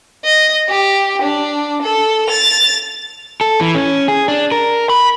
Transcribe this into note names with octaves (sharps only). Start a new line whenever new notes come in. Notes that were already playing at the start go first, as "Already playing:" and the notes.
D#5
G4
D4
A4
A6 F7
A4
E3
C#4
G#4
D4
A#4
B5